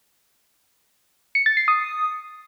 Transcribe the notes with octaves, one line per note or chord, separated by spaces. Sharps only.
C#7
A6
C7
D#6